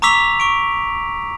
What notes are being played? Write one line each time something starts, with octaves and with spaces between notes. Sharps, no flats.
A#5 C#6 D6 E6 B6 F7
C#6 D7